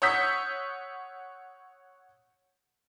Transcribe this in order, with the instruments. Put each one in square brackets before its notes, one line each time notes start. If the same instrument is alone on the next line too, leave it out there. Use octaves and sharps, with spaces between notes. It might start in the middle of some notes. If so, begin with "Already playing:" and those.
[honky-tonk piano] C#5 F#5 D#6 E6 G6 B6